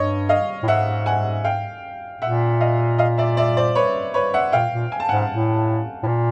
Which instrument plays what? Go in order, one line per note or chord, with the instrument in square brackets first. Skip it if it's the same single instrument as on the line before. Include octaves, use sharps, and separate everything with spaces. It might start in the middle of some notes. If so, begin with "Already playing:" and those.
Already playing: [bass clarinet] G2 [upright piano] C#5 D#5
[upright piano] D#5 F5
[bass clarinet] A2
[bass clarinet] G#2 [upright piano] E5 F#5
[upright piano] F#5 G#5
F5 G5
[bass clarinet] A#2 [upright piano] E5 F#5
[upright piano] D#5 F5
D#5 F5
D5 E5
D5 E5
C5 D5
B4 C#5
B4 C#5
E5 F#5
[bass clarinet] A#2 [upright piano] F5 G5
[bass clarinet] A#2
[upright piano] G#5
A5
[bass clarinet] G#2 [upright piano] F#5 G#5
[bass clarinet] A2
A2
A#2